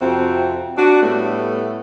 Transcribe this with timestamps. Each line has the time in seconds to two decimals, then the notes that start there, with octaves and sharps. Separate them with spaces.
0.01 F2 C3 C4 F#4
0.78 D4 F#4
1.02 A2 G3 A3 B3